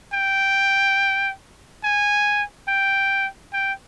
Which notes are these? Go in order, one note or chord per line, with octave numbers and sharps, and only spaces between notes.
G5
G#5
G5
G5